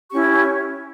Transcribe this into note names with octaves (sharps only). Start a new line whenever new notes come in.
C#4 E4 G4 C#6
B5
C#6